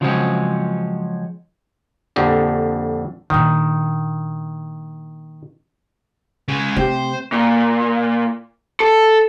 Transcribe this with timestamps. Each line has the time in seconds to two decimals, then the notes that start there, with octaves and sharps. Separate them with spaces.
0.01 C#3 F3 F#3 G#3 C4 C#4
2.16 A#1 F2 D3 G4
3.30 A#2 D#3 D4
6.48 C#3 G#3
6.77 C3 A3 G4 C5
7.32 A#2
8.80 A4